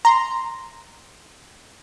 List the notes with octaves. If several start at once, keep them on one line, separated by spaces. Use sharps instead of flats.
A#5 C6